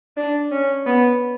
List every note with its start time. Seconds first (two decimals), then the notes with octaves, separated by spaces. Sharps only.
0.17 D4
0.51 C#4
0.86 B3